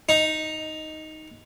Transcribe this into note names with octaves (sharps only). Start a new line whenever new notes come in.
D#4